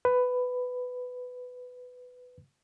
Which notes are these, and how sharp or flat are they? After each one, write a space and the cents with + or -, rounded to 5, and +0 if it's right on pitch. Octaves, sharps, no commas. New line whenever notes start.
B4 +10